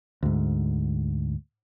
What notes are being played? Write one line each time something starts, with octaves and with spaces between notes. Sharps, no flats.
D2 G#2